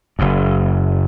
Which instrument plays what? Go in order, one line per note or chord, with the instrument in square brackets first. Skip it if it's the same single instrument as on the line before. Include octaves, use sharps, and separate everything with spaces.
[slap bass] F#1 F#2